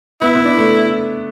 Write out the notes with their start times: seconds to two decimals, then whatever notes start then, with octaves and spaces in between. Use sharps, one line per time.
0.21 B3 E4
0.35 B3
0.45 D4
0.57 A3